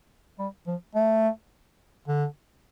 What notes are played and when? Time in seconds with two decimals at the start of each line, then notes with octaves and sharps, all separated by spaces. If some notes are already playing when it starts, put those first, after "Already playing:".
0.39 G3
0.67 F3
0.95 A3
2.08 D3